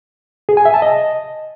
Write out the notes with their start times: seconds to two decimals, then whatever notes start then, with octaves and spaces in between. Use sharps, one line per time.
0.49 G#4
0.57 G#5
0.65 E5
0.74 A5
0.82 D#5